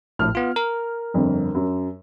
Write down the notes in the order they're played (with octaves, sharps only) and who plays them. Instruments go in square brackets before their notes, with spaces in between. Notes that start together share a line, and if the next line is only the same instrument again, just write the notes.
[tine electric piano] A#1 A2 [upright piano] F6
[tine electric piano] B3 F4
A#4
[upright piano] G1 F2
F#2